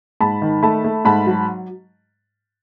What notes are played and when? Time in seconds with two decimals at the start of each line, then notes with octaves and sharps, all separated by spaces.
0.20 G#2 A5 B5
0.42 D#3
0.63 A3 A5 B5
0.84 A3
1.05 G#2 A5 B5
1.26 F#3